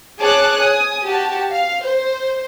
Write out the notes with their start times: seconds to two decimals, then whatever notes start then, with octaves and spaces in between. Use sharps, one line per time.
0.19 G#4 C#5 A5 D6 F#6
0.60 G#5 D#6
1.05 F#4 G4 A5
1.51 F5
1.83 C5